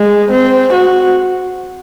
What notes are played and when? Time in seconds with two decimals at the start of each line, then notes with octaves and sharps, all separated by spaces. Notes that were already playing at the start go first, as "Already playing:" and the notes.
Already playing: G#3
0.32 C4
0.74 F#4